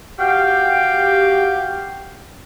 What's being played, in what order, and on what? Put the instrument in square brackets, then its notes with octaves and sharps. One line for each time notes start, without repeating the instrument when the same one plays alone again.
[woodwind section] F#4 G4 F5 G5